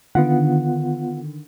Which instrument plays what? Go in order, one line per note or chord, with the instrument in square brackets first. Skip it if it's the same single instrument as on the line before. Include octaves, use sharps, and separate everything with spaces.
[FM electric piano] D3 D#3 [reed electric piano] B3 F4 F#5